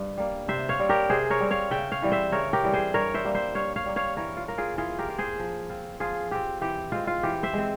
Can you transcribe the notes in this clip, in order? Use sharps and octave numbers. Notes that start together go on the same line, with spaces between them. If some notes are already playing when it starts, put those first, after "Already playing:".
Already playing: G2
G3 A#3
C3 C5 E5
C#5 F5
G3 C4
G4 A#4
C3 G#4 C5
A#4 C#5
G3 C4
C#5 F5
C#3 E5 G5
C#5 F5
E3 G3 C4
C5 E5
C#3 A#4 C#5
G4 A#4
E3 G3 C4
G#4 C5
G2 A#4 C#5
C5 E5
G3 A#3
C5 E5
G2 C#5 F5
C#5 F5
G3 A#3
C#5 F5
E3 A#4 C#5
F4
A#3 F4 A#4
F4 G#4
E3 F4 G#4
G4 A#4
A#3 F4
G#4 C5
F3
C4 F4
F3 F4 G#4
C4 F4 G4
E3 G4
G#3 C4 F4
F4
E3 G4
C5 E5
G#3 C4